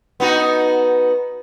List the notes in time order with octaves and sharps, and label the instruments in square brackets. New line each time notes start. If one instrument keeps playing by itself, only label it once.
[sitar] B3 D#4 F#4